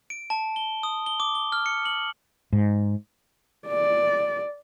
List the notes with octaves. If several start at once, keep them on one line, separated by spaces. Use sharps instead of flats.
D7
A5
G7
D#6
G7
D6
G7
F6
C#7
F#7
G#2
D5